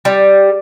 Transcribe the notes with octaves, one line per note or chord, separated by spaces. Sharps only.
G3